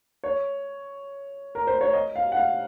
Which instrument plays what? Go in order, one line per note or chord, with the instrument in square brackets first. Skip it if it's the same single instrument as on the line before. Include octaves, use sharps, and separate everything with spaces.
[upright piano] C#5
A#4
C5
C#5
D#5
F5
F#5
F5